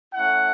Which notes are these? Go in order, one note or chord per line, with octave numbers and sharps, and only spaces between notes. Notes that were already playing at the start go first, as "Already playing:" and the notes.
A3 C#4 E4 F#5